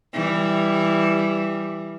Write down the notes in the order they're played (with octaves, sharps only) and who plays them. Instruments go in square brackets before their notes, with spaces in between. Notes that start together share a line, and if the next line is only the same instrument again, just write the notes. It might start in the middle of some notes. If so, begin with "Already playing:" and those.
[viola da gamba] E3 G3